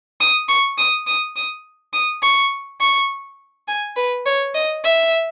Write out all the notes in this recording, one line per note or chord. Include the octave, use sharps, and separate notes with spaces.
D#6
C#6
D#6
D#6
D#6
D#6
C#6
C#6
G#5
B4
C#5
D#5
E5